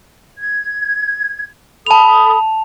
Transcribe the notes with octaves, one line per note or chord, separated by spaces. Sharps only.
G#6
A4 A5 B5 D#6 F7